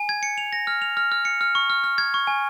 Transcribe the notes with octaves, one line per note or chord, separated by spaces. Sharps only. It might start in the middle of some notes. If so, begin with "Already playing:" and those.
Already playing: G#5
G#6
C#7
F7
A#6
F6
F7
F6
F6
C#7
F6
C#6
F6
F6
G#6
C#6
G#5